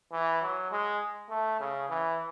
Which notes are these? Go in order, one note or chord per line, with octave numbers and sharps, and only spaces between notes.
E3
F#3
G#3
A3
C#3
E3